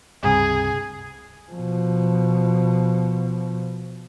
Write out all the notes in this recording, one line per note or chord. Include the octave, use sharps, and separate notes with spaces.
C#2 G2 C3 G#4
B2 F3